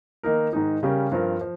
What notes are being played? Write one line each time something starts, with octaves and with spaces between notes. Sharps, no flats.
D#3 A#3 D#4 A#4
G#2 D#3 G#3 D#4
C#3 G3 C#4 G4 A#4
G2 F3 C4 F4 A#4
F3